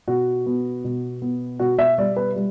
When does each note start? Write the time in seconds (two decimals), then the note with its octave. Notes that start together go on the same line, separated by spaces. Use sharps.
0.08 B2 F#4
0.46 B3
0.84 B2
1.22 B3
1.59 B2 F#4
1.78 E5
1.98 G3 D5
2.16 B4
2.36 G3